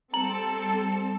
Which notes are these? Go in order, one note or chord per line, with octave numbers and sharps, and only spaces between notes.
G3 C4 A4 A#5 F#7